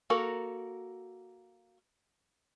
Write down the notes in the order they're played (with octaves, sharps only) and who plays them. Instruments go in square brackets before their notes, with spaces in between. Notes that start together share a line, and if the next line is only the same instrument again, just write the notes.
[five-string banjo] A#3 F#4 A4 A#4